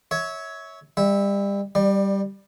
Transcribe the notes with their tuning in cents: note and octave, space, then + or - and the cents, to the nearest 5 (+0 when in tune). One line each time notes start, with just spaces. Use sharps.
C#5 +10 E5 -25
G3 +30 E5 -15
G3 +0 D5 +25